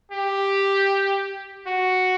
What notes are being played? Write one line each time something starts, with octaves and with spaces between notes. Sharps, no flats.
G4
F#4